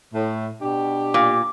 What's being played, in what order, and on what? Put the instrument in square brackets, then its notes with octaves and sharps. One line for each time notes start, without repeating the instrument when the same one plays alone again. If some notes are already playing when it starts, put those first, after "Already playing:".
[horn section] A2
B2 D4 G4
[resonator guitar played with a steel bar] A#2 [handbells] D6